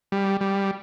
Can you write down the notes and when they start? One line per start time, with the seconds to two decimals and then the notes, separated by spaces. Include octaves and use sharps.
0.12 G3
0.41 G3